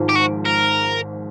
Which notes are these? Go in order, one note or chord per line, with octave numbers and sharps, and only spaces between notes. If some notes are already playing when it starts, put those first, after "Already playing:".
Already playing: G#1 G#2 F3
G4
F#4
A#4